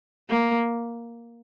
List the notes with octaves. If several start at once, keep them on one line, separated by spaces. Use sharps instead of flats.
A#3